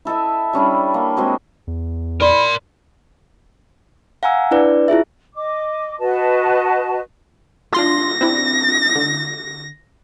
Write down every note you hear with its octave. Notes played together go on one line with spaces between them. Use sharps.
E4 A4 D#5 E5
G3 C#4 D4 E4
A#3
G#3 C4 F#4 G#4
E2
A#4 D5 B5 C6
F5 F#5 G#5 A#5 E6
D4 E4 B4 D5
E4 F4 G#4 E5
D#5 D6
F#4 B4 D#5 A5
D4 F4 C6 A#6
C4 D4 E4
D3